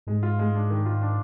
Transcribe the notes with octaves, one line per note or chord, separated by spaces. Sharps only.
G#2 G#3
F4
G#3
D4
D#3
F4
D4